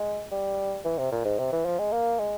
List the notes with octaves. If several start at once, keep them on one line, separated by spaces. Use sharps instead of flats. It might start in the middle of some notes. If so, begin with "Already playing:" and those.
Already playing: G#3
G3
E3
C3
A#2
G#2
C3
E3
F3
G#3
A#3
G#3